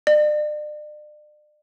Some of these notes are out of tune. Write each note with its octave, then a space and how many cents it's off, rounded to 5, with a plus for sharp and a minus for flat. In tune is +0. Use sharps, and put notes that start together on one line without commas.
D5 +40